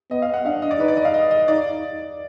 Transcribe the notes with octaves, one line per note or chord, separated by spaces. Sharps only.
B3 D#5
F5
F#5
D4 F5
D#5
D5
D#4 B4
D5
D#5
F5
D#5
D#5
D#4 D5